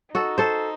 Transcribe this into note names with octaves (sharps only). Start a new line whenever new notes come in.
D#4 F#4 A4
A4 C5